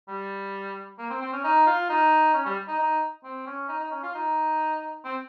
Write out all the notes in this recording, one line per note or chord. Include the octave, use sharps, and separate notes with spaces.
G3
A#3
C4
C4
C#4
D#4
F4
D#4
C#4
G3
D#4
D#4
C4
C#4
D#4
D#4
C#4
F4
D#4
C4